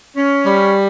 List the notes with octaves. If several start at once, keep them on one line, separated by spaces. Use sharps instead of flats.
C#4
G3